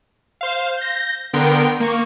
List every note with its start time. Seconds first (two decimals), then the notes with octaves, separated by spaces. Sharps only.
0.41 C5 F5
0.77 G6 A#6
1.33 D3 B3 A#4 G5 C6
1.80 A#3 C#6